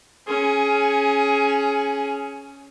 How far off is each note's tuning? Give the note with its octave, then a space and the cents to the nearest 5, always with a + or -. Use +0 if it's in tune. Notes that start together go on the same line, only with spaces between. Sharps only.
C#4 +0 G#4 +20